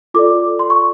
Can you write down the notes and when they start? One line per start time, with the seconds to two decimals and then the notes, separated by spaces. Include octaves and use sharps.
0.14 F4 A4 D5 D6
0.59 C6
0.70 C#6